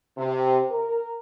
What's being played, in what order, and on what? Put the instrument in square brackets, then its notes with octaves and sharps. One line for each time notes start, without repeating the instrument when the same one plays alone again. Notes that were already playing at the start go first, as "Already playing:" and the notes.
[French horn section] C3
A#4